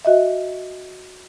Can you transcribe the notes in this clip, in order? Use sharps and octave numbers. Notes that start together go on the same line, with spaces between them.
F#4 D#5 E5